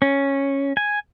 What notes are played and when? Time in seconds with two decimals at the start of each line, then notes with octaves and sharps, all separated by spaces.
0.02 C#4
0.77 G#5